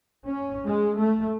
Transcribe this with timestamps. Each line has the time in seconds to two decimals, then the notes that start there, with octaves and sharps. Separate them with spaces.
0.24 C#4
0.67 G#3
0.99 A3